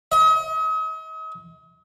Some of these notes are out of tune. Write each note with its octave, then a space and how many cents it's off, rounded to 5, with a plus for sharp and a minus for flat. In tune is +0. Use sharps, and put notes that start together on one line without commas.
D#5 +40